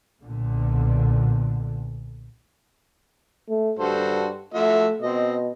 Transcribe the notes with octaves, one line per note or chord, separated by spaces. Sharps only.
B1 A#2 D3
A3
G2 F#4 A4 C5
F3 A3 F#4 E5
B2 C4 D#5